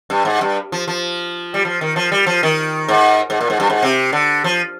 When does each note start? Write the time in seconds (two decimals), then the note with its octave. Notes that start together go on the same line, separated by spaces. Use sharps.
0.10 G2
0.25 G#2
0.41 G2
0.72 F3
0.88 F3
1.54 G3
1.65 F3
1.81 D#3
1.96 F3
2.12 G3
2.26 F3
2.43 D#3
2.88 G#2
3.30 G#2
3.41 A#2
3.50 G#2
3.60 G2
3.70 G#2
3.83 C3
4.12 D3
4.44 F3